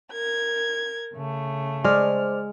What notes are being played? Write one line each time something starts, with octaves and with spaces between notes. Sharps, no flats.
A#4 G#6
C#3 A3
G#3 C5 D5 F6